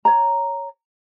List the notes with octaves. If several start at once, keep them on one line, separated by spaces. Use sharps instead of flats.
C#5 A#5